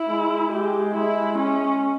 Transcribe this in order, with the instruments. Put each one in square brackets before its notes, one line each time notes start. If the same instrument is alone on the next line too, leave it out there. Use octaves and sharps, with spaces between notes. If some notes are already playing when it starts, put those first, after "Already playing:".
Already playing: [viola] E4
[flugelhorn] G#3
[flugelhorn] G#3 [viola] G4
[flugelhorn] G#3 [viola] E4
[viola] C#4